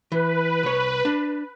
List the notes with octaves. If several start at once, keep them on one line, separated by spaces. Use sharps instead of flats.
E3 B4
C2 C#5
D4